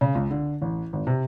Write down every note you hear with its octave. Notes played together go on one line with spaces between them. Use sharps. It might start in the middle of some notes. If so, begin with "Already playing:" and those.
C#3
C#2
D3
A1
G#1
C3